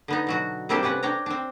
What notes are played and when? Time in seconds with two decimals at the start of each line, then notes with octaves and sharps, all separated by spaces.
0.08 D3 B3 D#4
0.27 B2 F#3 F#4
0.69 G3 A#3 C4 D4 G4 A4
0.83 C3 C#4 B4 F#5
1.03 D4 C#5 G5 A#5
1.26 C4 D4